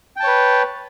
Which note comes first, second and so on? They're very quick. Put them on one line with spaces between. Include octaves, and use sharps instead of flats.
G5 A5 C#5 B4